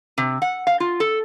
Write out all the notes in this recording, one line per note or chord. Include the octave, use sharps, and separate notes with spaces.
C3
F#5
F5
F4
A4